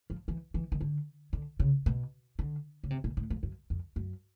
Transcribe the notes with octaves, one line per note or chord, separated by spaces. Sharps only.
F3
E3
E3
D#3
D3
D3
C#3
B2
D3
C#3
C3
A#2
A2
F2
F#2
F2
F#2